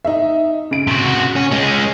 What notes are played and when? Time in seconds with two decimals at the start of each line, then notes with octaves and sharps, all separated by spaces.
0.05 D#4 E5
0.71 C#3 D7
0.87 C3 F#4
1.36 C#4
1.51 G#3 C#4